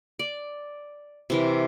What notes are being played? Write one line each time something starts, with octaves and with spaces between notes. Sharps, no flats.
D5
C3 E3 A#4